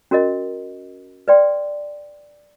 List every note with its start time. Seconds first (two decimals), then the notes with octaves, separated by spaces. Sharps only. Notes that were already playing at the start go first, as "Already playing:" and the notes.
0.11 C#4 F#4 A#4 D#5
1.28 B4 D5 G5 C6